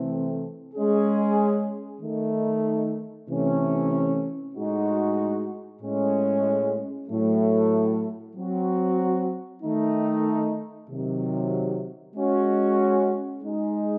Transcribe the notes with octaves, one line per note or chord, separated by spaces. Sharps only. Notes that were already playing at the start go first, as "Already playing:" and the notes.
Already playing: C3 E3 A3 C4
G#3 C#4 G#4
D#3 A3 D#4
C3 E3 A3 C#4
A2 G#3 D#4 F#4
A2 G#3 C#4
A2 F#3 A3
F#3 C4 F#4
D#3 A3 D#4
C3 D#3 F#3
G#3 C#4 F#4
G#3 D#4 G#4